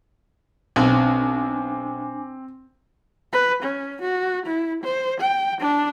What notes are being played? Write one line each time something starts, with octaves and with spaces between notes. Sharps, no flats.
B1 C4 D4 G#5 D6
B4
C#4
F#4
E4
C5
G5
D4